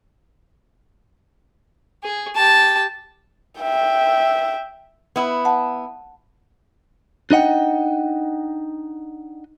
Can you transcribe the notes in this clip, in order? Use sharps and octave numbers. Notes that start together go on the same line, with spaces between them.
G#4
G4 A5
E5 G5
B3 E4
F#5 A5
D4 D#4 D#5 F#5 G5